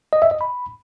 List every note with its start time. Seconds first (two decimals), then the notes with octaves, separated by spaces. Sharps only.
0.13 D#5
0.22 E5
0.31 D#5
0.41 B5